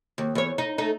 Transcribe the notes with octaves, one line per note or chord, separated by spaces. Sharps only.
D#2
E2 C#5
D#4
A3 D#4